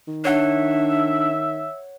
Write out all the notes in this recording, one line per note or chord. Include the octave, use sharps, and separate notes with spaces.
D#3
D4 C#5 E5 F#5